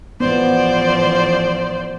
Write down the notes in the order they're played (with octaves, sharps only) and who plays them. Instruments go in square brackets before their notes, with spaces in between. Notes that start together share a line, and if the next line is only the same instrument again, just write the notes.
[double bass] A1 F3 [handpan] B3 [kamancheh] C5 D5